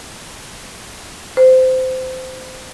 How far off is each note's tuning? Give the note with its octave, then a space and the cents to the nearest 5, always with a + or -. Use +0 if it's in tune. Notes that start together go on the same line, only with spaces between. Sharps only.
C5 -20